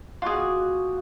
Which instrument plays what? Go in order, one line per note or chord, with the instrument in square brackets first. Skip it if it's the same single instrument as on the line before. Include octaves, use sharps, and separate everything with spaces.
[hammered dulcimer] B2 F#4 D6 [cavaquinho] F4 G#4